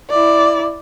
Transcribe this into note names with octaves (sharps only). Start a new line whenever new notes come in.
E4 D5